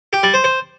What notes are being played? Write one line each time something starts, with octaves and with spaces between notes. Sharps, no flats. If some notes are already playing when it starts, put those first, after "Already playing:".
G4
G3
C5
C5